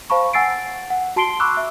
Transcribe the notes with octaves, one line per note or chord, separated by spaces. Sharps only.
C5 F5 A5 B5 C#6
F#5 G#5 E6 A6 C7 D7
F#5
F#4 A5 C6 C7 D7 G7
B5 C#6 D6 E6 F#6
E5